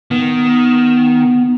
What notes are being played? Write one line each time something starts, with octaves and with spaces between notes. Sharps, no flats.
D#3 B3